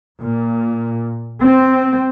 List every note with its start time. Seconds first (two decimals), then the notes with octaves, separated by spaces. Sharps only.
0.21 A#2
1.42 C4